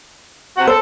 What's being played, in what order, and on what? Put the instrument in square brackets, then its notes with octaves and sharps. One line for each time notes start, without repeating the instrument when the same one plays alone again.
[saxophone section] C3 F#4 F#5
[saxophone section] A4 [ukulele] C5